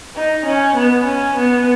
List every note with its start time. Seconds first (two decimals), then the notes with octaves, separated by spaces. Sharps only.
0.16 D#4
0.46 C#4
0.75 B3
1.06 C#4
1.36 B3